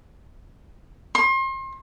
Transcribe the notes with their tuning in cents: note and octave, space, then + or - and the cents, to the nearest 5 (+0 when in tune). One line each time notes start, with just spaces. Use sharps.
C6 +35